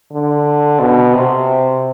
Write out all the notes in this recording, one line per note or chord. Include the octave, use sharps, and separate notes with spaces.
D3
B2
C3